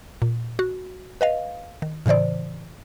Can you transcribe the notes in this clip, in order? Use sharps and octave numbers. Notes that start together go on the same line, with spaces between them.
A#2
F#4
B4 D#5 F5
D#3
A2 C#3 E3 C5 D5